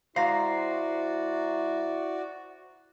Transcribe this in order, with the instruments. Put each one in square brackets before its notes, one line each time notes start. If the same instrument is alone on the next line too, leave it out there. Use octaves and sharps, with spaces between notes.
[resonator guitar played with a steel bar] G#2 G#3 F5 [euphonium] E4 [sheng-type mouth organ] F#4 D5 [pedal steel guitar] C5 A#5